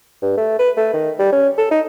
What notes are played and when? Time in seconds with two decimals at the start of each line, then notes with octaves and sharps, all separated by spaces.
0.22 G2
0.37 A3
0.59 B4
0.77 A3
0.93 D#3
1.19 G3
1.32 C#4
1.58 A4
1.71 D#4